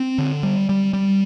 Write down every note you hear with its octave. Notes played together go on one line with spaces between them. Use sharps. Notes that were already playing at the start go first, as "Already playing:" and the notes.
Already playing: C4
D3
G3
G3
G3